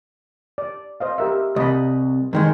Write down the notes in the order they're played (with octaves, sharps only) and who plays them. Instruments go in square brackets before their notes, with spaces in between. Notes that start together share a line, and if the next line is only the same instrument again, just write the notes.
[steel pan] D5
C5 D#5 F5
G4 A#4 E5
[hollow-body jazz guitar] C2 [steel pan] D#5 B5
[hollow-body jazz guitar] F#2 D#3 G#3